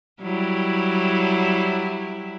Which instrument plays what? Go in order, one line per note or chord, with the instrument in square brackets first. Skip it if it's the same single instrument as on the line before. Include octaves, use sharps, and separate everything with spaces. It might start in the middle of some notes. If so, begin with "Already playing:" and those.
[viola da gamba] F#3 G3 E4